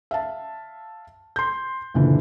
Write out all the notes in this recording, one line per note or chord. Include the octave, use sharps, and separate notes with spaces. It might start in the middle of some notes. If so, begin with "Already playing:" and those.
E5 F5 A5
C6 G6
F#1 A#2 D3 E3